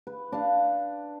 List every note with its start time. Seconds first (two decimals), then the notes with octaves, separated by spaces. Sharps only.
0.07 B4
0.32 D4 F5